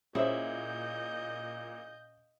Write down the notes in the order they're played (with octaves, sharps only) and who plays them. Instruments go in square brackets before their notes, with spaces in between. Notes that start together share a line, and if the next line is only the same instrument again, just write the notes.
[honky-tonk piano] A#2 [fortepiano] C#4 C5 E5 [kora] E4 G#4 [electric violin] D#5 G6